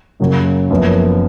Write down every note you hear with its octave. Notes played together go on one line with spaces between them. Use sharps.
F#2 C#3 F#3 A#3
F#1 F#2 F3 B3